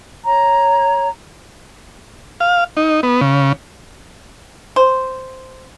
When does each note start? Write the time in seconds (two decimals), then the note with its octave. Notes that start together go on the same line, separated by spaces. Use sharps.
0.24 C#5 A#5
2.40 F5
2.77 D#4
3.03 B3
3.21 C#3
4.76 C5